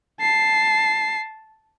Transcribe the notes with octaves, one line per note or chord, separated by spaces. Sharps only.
A5 C7